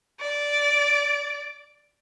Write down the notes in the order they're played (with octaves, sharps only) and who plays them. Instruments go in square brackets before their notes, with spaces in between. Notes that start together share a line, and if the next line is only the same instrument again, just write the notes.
[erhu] D5